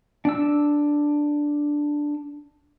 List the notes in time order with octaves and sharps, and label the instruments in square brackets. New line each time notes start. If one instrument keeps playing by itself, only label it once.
[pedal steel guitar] D4 E6